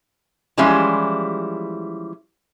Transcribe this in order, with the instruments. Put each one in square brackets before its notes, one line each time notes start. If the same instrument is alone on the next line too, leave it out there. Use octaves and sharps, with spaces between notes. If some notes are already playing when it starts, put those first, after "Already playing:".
[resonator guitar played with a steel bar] E3 F3 G3 G#3 C#4 E4